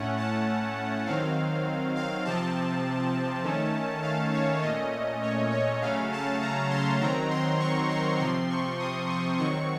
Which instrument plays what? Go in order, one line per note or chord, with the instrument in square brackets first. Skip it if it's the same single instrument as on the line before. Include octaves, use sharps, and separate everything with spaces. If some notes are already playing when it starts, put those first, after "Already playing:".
Already playing: [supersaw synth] A2 A3 C#4 F#5
A5
D#3 F#3 C4 F5
F5
C3 F3 C4 A5
D#3 A3 C#4
F5
C#5
A#2 A3 C#4 D#5
C#5
C#5
C#3 F#3 A3 C#4 F5
A5
A#5
C6
D#3 F#3 C4 A#5
C6
C#6
C6
C3 F3 C4 C6
C#6
D#6
C#6
D#3 F#3 C4 C#6